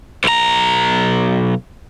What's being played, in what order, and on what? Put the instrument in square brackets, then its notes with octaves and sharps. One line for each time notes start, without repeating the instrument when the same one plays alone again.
[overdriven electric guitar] B1 A#5